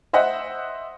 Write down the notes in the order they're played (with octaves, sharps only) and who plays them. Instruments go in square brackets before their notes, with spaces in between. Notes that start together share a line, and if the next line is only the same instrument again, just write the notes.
[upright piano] C5 D#5 E5 F#5